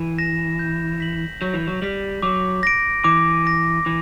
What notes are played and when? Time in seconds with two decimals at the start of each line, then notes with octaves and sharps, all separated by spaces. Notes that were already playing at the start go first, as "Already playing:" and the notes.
Already playing: E3
0.18 A#6 E7
0.59 G6
1.00 B6 F#7
1.41 F#3 G6
1.54 E3
1.67 F#3
1.82 G3 B6 F#7
2.22 F#3 D6
2.63 A#6 D7
3.04 E3 D6
3.45 A#6 D7
3.86 E3 D6